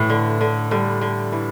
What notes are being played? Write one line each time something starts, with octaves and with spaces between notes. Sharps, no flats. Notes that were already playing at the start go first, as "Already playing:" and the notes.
Already playing: A2 E3
D3
D3
D3 G3
D3
E3